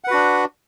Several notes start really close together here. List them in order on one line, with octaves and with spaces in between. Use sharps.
F#5 B4 F#4 D4